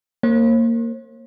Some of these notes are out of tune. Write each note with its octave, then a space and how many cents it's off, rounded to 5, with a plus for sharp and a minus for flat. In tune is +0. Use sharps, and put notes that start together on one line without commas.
A#3 -15 C5 +45